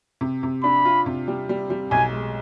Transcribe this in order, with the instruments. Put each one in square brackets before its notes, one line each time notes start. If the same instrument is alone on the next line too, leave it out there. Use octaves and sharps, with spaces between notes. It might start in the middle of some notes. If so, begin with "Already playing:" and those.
[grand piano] C3
C3
[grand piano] D4 [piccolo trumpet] B5
[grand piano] F4
C3
G3
G3
G3
[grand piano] B1 [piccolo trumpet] G#5
[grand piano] G#3